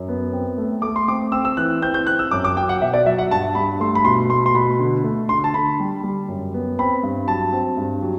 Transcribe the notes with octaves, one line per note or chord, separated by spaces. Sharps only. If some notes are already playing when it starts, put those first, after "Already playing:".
Already playing: F#2
B3
C4
A3
A3 D6
C6
C4 D6
C4 E6
E6
E3 F#6
C4 G6
G6
C4 F#6
E6
F#2 D6
D6
F#3 G5
F#5
B2 E5
D5
F#3 E5
F#5
G2 A5
G2 B5
A3 C6
B5
B2 C6
A3 C6
C6
B2 B5
D3
A3
D3 C6
A5
D3 B5
G3
G3
F#2
B3
C4 B5
G2
F#3 A5
C4
G2
F#3